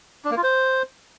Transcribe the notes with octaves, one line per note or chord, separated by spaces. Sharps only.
D4
A#3
F4
C5